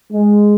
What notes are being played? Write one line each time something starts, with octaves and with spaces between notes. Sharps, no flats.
G#3